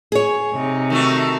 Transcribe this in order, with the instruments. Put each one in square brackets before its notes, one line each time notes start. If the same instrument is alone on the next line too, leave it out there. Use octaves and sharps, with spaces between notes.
[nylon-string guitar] G#4 C#5
[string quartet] C3 D#4
[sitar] D#3 A3 F#4